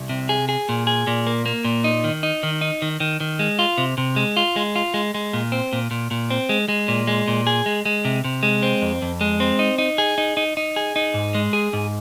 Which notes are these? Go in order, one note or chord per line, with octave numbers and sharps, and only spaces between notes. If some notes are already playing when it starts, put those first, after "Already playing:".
Already playing: C2
C3
G#4
G#4
A#2
G#4
A#2
A#3
A#3
A#2
D#4
D#3
D#4
D#3
D#4
D#3
D#3
D#3
G#3
F4
C3
C3
G#3
F4
G#3
F4
G#3
G#3
A#2
C4
A#2
A#2
A#2
C4
G#3
G#3
A#2
G#3
A#2
G#4
G#3
G#3
C3
C3
G#3
C4
F2
F2
G#3
C4
D#4
D#4
G#4
D#4
D#4
D#4
G#4
D#4
G#2
G#3
G#4
G#2